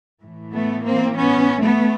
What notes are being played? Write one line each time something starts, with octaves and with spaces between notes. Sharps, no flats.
A2 E3
A3 B3
A#3 C4
B3 C#4
A3 B3